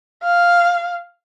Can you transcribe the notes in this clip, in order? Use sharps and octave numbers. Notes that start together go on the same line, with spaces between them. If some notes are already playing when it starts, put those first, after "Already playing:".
F5